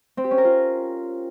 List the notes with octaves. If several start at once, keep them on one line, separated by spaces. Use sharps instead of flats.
C4
G4
C#4
A#4
F4